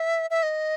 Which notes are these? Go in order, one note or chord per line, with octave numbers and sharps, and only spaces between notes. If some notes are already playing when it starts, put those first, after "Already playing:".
Already playing: E5
E5
D#5